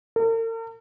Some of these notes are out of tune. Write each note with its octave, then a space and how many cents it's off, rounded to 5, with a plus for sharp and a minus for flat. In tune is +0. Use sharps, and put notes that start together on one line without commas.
A#4 -45